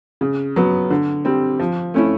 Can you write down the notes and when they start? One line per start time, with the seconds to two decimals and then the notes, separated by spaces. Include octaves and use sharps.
0.21 C#3
0.56 F#3 B3
0.90 D3
1.25 G3 C4
1.59 F3
1.94 A3 C#4 E4